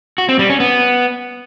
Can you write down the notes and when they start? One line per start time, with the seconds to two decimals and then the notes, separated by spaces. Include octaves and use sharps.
0.18 F#4
0.29 C4
0.39 G3
0.50 C#4
0.60 B3